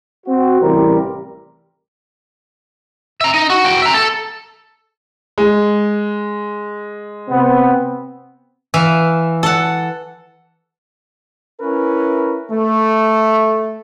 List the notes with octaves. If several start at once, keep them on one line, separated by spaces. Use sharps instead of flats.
C4 F#4
A1 C3 E3 G3 C4 A#4
E5 A#5
D#4
F#4
F#4 G5
E5 A#5
A4
G#3
C3 B3 C4
E3 E5 F5
A4 F#5
C#4 E4 A#4 B4
A3